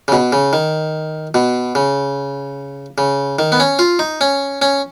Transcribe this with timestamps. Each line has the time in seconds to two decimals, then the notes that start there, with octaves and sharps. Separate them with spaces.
0.08 C#3
0.12 B2
0.33 C#3
0.53 D#3
1.34 B2
1.75 C#3
2.98 C#3
3.39 D#3
3.52 B3
3.60 C#4
3.79 F4
3.99 D#4
4.21 C#4
4.62 C#4